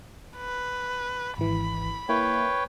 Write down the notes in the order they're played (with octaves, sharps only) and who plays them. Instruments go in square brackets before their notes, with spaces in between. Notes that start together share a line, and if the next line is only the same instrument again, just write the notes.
[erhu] B4
[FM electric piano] G#1 E3 [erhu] B5
[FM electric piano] A#3 E4 [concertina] B4 C#5 G5